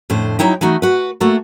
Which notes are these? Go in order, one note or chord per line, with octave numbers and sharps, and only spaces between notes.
F2 A2 D3 C5
F#3 D#4 E4 G5
E3 A3 D#4 F#4
F#4 B4
A3 A#3 F#4 A4